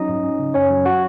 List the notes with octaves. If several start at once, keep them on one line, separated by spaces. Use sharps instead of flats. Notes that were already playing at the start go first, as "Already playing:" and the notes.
Already playing: F#3 C#4 D#4 D#5
G#2
C#4
C#3
F#2 C#4 C#5
F#3
F#3 F#4 F#5